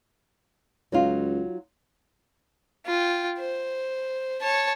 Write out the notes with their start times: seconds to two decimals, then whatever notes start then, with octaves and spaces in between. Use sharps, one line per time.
0.92 C#2 F#3 D#4 F4
2.87 F4 G5
3.39 C5
4.42 C#5 A5